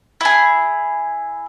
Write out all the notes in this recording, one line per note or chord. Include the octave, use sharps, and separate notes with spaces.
E4 G#4